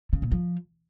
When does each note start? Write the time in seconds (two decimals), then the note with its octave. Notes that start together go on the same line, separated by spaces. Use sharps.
0.13 C#3
0.22 A#2
0.32 F3